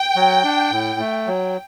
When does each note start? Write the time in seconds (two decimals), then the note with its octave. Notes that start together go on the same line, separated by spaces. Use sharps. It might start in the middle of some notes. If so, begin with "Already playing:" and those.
Already playing: G5
0.16 F#3
0.44 D4
0.71 A2
1.00 A3
1.27 F#3